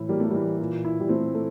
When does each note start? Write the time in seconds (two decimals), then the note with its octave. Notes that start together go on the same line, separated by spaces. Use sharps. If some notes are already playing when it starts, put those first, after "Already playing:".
Already playing: A2 E3 E4
0.09 G3 A#3
0.20 A3
0.30 E3 G3
0.59 A#2
0.85 E4
1.00 G3
1.09 A3 C4
1.35 A3